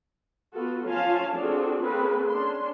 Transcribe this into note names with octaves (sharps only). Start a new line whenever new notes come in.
B3 F4 F#4 A4
F3 C#4 F4 F5 G#5 A5
C4 D4 F4 F#4 G#4 A4
A#3 C4 C#4 G#4 A4 B4
C#4 D4 C6